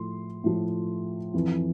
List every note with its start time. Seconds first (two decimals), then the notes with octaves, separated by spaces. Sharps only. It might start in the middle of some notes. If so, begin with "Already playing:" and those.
Already playing: A2 F3 C6
0.44 A2 F3
1.34 F2 E3